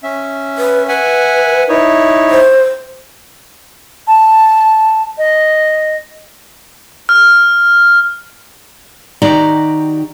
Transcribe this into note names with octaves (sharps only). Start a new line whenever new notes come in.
C#4 E5
B4
B4 E5 F#5 G#5
D#4 E4 C#5
C5
A5
D#5
F6
D#3 F#4 G4 D5 A#5